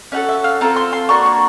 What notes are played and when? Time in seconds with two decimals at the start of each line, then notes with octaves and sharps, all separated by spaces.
0.12 C#4 F#4 A4 D#5
0.29 E5
0.44 F5
0.61 C4 F4 A4 A#5
0.76 C6
0.93 C6
1.09 A#3 D4 F#4 C#6
1.26 C#6